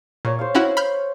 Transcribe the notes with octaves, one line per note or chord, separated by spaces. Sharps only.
A#2 C#5
C5 C#5 F5
C#4 E4 F#4
B5 F6 G6